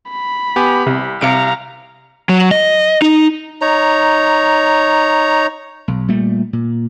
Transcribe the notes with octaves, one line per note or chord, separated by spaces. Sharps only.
B5
B3 G4 G#5
C2 C3
C2 C3 F5 A#5 C#7 D7
F#3
D#5
D#4
D#4 C#5 A#5
B1
A#2 G3 A3
A#2